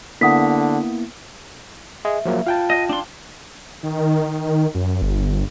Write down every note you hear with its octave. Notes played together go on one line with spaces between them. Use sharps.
D3 A#3 B3 E4 F#5 D#6 B6
G#4 D#5 E5
F3 F#3 A#3
F4 F5 G5 A5
D#5
D4 C6
D#3
F#2
G1